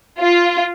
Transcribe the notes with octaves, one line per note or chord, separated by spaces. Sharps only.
F4